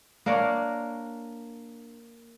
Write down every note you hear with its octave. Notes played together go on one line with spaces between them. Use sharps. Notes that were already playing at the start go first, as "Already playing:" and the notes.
A#3 D4 A#4 C#5